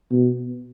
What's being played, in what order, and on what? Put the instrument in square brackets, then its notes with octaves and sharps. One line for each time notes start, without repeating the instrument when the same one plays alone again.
[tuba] B2